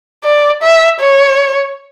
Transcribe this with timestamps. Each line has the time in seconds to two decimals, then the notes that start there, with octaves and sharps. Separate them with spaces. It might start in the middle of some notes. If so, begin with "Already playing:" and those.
0.24 D5
0.62 E5
1.00 C#5